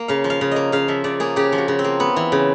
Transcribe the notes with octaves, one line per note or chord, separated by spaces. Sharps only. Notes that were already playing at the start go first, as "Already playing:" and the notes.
Already playing: A#3
C#3 F5
F3
F5
C#3
A#3 D#5
C#3 F5
F3 E5
C#3 D5
A#3 G#4
C#3 G4
F3
F#4
C#3
C4
A#3
B3
E3
C#3